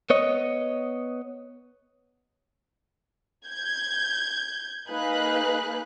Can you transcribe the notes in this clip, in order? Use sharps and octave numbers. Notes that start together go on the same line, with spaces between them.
B3 C#5 D#5
G6 G#6
A#3 D#4 G#4 B4 F5 F#6